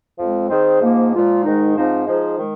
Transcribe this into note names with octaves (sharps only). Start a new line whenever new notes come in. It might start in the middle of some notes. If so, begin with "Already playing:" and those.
F2 F3 G#3 C4
D#3 C4 G#4 C5
G#2 F3 A#3
A#2 F3 G#3 F4
G#2 D#3 G#3 D#4
G#2 F3 C4 D#4 C5
F3 G#3 D#4 G#4 C5
D#3 G#3